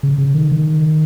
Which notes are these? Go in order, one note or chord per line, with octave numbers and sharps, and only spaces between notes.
C#3
C#3
D#3
D#3